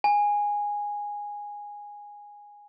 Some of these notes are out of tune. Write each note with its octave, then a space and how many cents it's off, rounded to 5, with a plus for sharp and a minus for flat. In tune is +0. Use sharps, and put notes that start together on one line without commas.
G#5 -10